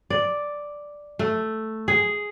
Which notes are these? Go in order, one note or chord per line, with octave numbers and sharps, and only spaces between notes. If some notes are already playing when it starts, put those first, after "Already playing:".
D5
A3
G#4